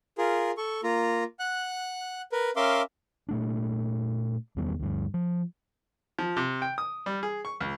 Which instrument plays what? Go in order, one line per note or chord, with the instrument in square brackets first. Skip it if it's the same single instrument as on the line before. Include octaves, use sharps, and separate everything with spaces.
[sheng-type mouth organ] F4 G#4 A#4
A4 C#6
A#3 F4 A#5
F#5 F#6
A#4 B4
C#4 A#4 E5 F5 C6 D6
[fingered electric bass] A#2 A3 D4
E2 D#3 G3 B3
D2 G2
F3
[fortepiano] F3
C3
G5
D#6
G3
G#4
C#6
C#2